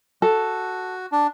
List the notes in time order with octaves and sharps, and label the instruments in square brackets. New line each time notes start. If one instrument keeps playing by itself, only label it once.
[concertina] F#4 [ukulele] A4
[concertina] D4